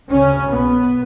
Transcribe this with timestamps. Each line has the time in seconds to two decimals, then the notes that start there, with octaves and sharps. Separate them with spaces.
0.09 D2 C#3 C#4
0.48 B1 B2 B3